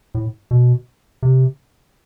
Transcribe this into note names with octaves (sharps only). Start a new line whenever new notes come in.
A2
B2
C3